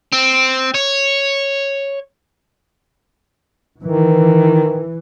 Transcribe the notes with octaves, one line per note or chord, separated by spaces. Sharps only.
C4
C#5
D#3 E3